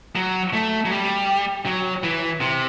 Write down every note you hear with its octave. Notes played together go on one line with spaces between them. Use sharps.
F#3
A3
F#3
G3
F#3
E3
C3